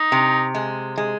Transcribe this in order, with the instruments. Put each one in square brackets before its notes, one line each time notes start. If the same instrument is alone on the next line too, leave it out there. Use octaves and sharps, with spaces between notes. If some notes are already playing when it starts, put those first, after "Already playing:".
Already playing: [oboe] D#4
[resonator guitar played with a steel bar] C3
G#3
G#3